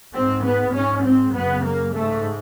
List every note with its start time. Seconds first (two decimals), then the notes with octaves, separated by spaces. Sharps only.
0.13 G#2 C4
0.43 B3
0.73 G#2 C#4
1.04 C4
1.34 F#2 C#3 B3
1.64 A#3
1.94 G#2 A3